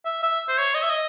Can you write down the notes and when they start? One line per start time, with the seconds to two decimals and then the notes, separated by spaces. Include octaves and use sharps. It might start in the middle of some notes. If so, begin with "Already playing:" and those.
0.05 E5
0.23 E5
0.49 C5
0.58 C#5
0.75 D#5
0.83 E5
0.91 D#5